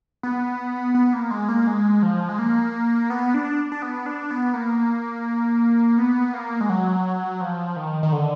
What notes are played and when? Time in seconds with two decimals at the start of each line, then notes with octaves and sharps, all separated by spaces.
0.23 B3
0.94 B3
1.13 A#3
1.31 G#3
1.49 A#3
1.67 G#3
2.03 F3
2.29 G#3
2.39 A#3
3.10 B3
3.34 D4
3.72 D4
3.82 B3
4.06 D4
4.31 B3
4.54 A#3
5.98 B3
6.34 A#3
6.61 G#3
6.70 F#3
7.41 F3
7.76 D#3
8.03 D#3
8.12 D3